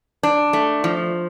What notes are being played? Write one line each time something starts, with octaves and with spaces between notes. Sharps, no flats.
D4
A3
F3